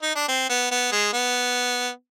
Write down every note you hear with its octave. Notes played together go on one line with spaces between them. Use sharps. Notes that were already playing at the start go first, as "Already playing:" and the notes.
D#4
D4
C4
B3
B3
G#3
B3